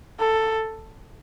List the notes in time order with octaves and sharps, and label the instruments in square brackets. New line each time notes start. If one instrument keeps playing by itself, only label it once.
[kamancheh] A4